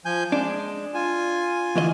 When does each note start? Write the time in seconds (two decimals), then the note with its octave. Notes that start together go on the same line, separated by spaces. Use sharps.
0.05 F3 G#5 G6
0.32 G#3 D4
0.94 F4 G#5
1.76 D2 E3 D#5